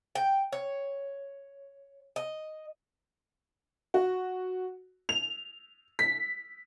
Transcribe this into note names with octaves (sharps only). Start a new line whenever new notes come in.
G5
C#5
D#5
F#4
F7
B6